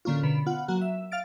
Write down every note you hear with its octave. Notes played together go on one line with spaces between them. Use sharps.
A2 D3 A#3 C#4 F4
B2 D3 B5
B3 F4 F#5
F#3 A#3 F#4
E5
F5 F6 A6 D7